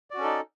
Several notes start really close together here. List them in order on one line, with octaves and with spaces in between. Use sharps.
D5 F#4 C#4 A4 D#4